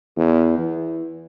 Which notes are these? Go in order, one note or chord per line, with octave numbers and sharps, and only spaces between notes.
E2
E3